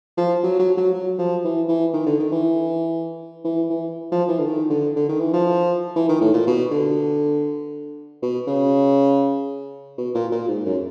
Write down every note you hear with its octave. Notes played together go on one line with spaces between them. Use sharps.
F3
F#3
F#3
F#3
F#3
F3
E3
E3
D#3
D3
D#3
E3
E3
E3
F3
E3
D3
D#3
D3
D3
D#3
E3
F3
E3
D#3
A2
A#2
B2
D3
B2
C#3
B2
A#2
A#2
G#2
F#2